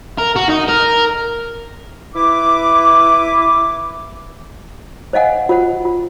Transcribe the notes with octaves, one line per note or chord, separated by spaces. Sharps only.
A#4
F#4
D#4
A#4
E4 B4 D6
C5 D#5 F5 F#5 G#5
F4 C5 F#5
F4